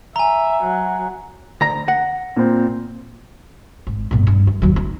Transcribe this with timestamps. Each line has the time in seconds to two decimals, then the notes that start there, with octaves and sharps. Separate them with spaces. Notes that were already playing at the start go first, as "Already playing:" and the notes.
0.16 E5 G#5 A#5
0.63 F#3
1.61 D2 A#5 A#6
1.88 F#5
2.36 A#2 C4
3.87 G#1
4.11 G1 A#2
4.27 G2
4.47 F#2
4.62 D#2 F#3
4.76 D#4